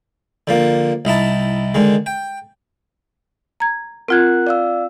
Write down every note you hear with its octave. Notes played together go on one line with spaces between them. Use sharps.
D3 F3 A#3
C2 D#4 E4 A5
D3 D#3 G#3
G5
A#5 G#6
C4 F4 A#4 F#5 F#6 G#6
D5 F5 E6